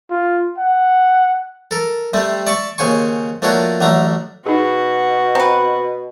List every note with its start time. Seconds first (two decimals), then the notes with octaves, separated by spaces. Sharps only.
0.10 F4
0.58 F#5
1.71 A4 A#4
2.13 C3 G3 A3 C4
2.47 D5 E5 A5 C#6
2.78 D#2 C#3 C5 G#5 C#6
3.42 F3 A3 A#3 D4 F#4 C#5
3.81 A1 D3 F#3 A3 A#5
4.46 B2 D#4 F#4 G#4
5.35 C4 B4 A#5